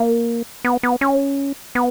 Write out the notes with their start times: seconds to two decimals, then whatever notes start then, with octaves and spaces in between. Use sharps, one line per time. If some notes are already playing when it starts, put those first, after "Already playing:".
Already playing: A#3
0.65 B3
0.83 B3
1.01 C#4
1.75 B3